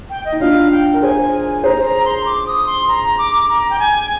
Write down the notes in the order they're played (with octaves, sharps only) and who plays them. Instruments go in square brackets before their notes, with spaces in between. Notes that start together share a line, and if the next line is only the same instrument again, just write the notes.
[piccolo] G5
D#5
[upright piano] D#4
[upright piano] D4 F4 [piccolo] F5
[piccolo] G5
[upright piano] A#4
[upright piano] G#4 C5 [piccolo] G#5
[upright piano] G#4 C5 [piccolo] A#5
[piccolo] A#5
C6
D6
D#6
C6
A#5
D6
A#5
G5
G#5